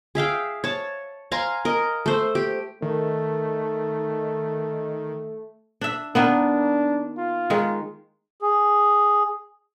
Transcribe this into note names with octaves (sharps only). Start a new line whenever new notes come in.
G#4 E5 F5 G5
C#5 A5
F5 G#5 A#5 C6
A#4 D#5
A3 C5
G4
D#3 A3
D4 E5
D#3 A#3 B3 D4
F4
D#3 G#3
G#4